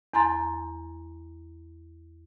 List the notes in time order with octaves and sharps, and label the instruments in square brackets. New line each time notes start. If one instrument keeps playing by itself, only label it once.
[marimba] E2 G#5 A#5 C6 A6